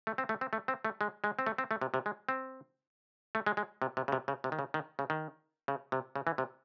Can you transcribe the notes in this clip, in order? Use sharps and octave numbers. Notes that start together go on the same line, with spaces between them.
A3
C4
A3
C4
A3
C4
A3
G#3
G#3
C4
A3
C4
A3
C3
C3
G#3
C4
A3
G#3
G#3
C3
C3
C#3
C3
C#3
C3
D#3
C#3
D#3
C#3
D#3
C#3
C3
C#3
E3
C3